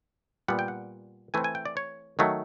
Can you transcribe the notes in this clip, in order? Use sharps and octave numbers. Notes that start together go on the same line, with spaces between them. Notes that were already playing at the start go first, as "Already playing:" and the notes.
A#2 G3 B3 F#5
G5
F#5
E3 A3 C4 G#5
G#5
G5
D5
C#5
D#3 F#3 A3